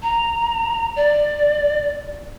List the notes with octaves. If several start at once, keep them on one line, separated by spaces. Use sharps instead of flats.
A#5
D5